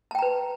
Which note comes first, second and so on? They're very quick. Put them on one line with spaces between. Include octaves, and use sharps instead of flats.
A5 G5 A#5 B4